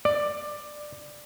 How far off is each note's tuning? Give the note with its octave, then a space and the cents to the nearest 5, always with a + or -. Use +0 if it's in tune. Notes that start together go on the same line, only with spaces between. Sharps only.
D5 +15